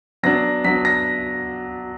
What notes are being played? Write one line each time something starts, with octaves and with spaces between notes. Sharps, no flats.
F#3 B3 D4 A#6
F#3 B3 D4 B6
A#6